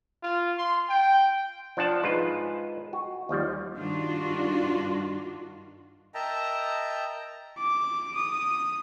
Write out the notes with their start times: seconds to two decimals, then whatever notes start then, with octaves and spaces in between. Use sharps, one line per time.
0.23 F4
0.58 C6
0.90 G5
1.77 F3 D4 F#5 A5
2.03 G#2 G#3 F4 B4
2.93 F#4
3.29 D#2 F3 G3
3.77 G2 D#3 D4 F4 F#4
6.14 A#4 D#5 E5 G5 A5 A#5
7.58 D6
8.15 D#6